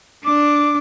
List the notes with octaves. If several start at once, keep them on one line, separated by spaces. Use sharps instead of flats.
D4 D6